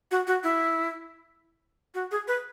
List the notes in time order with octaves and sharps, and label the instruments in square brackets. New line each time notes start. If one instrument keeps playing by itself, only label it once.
[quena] F#4
F#4
E4
F#4
G#4
B4